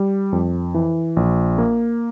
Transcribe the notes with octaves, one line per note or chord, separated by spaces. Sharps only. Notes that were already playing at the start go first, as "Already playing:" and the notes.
Already playing: G3
F2
E3
A#1
A#3